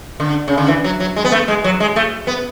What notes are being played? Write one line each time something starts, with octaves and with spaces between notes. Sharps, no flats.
D3
C#3
D3
E3
F#3
F#3
G#3
B3
A3
G#3
F#3
G#3
A3
B3